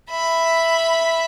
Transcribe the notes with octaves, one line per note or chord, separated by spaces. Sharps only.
E5 B5